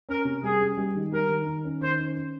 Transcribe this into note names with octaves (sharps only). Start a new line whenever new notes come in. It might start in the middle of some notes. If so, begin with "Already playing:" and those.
C#4 A#4
C3
G3 G#4
C#4
G3
D#3
G3 A#4
D#3
D#3
C#4
D#3 C5
C#4
C#4